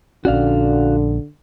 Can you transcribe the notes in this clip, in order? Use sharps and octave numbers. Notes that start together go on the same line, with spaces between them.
A#1 D3 C#4 F#4 D5 F5